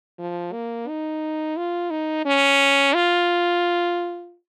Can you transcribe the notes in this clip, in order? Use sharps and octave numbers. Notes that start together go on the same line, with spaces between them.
F3
A#3
D#4
F4
D#4
C#4
F4